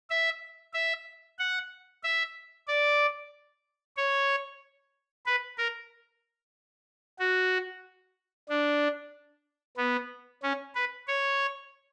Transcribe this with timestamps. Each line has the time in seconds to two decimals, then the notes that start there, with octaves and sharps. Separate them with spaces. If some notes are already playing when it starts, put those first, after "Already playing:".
0.10 E5
0.74 E5
1.39 F#5
2.04 E5
2.68 D5
3.97 C#5
5.26 B4
5.58 A#4
7.19 F#4
8.49 D4
9.77 B3
10.43 C#4
10.75 B4
11.07 C#5